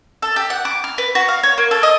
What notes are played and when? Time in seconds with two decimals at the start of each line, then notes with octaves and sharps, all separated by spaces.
0.22 A4
0.36 G4
0.50 F#5
0.65 D6
0.84 F6
0.98 B4
1.15 F#4
1.29 F5
1.43 C#5
1.58 A#3
1.71 A4
1.83 D#5